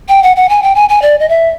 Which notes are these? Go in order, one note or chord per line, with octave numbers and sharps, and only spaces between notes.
G5
F#5
F#5
G#5
G5
G#5
G#5
D5
D#5
E5